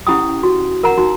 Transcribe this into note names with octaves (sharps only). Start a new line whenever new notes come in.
C#4 E4 G4 F#5 G5 D#6
F#4
A#4 F#5 A#5
D#4 F#4